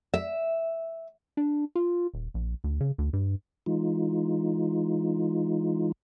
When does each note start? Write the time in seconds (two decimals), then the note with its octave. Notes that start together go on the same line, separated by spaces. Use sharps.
0.14 E5
1.37 D4
1.75 F4
2.14 D#1
2.34 A#1
2.64 D2
2.80 C#3
2.98 D2
3.13 G2
3.66 E3 G#3 D#4 F4